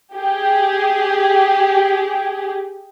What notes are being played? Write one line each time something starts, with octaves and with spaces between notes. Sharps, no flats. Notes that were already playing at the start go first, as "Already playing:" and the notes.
G4 G#4